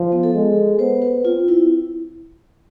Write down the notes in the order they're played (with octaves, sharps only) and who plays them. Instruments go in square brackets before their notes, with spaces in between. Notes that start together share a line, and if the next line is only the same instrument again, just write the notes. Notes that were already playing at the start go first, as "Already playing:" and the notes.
Already playing: [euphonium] F3
[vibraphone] B3
A4
[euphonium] G#3
[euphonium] B3 [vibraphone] C5
[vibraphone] B4
[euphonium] C4 [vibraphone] F4
[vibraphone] E4